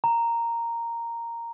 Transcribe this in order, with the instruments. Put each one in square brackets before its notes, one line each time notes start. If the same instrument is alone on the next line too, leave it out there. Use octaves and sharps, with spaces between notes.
[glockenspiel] A#5